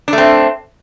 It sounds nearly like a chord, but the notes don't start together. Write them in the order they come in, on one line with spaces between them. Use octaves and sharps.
D4 A3 C4